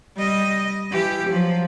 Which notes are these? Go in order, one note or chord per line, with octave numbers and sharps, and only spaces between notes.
G3 D#5
E3 G4
F3 F#3